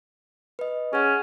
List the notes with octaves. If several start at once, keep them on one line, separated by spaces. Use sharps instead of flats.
B4 D#5
C#4 G#4 F#5